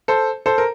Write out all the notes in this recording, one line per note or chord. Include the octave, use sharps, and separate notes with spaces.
A4 C5
A4 C5
A#4